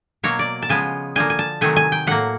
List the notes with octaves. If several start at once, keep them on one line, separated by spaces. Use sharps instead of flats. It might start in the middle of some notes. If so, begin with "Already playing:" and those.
B2 F#3 A#3 C#5
D5
A5
C#3 F3 G#3 B3 G#5
D3 F3 A#3 G#5
G#5
A5
C3 D#3 F#3 A3 G#5
G#5
G5
A2 F#3 A#3 F#5